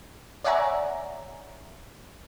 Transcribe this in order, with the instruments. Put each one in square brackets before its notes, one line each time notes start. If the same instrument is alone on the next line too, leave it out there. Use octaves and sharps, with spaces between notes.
[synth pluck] C#5 D5 E5 F#5 G#5 A#5